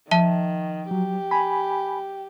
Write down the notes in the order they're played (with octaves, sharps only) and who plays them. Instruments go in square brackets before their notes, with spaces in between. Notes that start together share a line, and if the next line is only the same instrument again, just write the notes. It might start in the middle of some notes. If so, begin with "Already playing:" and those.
[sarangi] D#3 [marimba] F3 [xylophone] E5 A5 G7
[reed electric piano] F#3 [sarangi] G4
[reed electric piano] G#5 B5